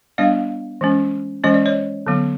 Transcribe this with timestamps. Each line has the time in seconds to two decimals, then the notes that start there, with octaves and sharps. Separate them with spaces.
0.18 G3 B3 D4 D#5 F5
0.81 E3 G#3 C#4
1.44 E3 G#3 C#4 D#5
1.54 D5
1.66 C#5 D#5
2.07 D3 F#3 B3